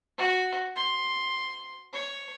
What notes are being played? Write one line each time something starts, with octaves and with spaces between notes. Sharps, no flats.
F#4
C6
C#5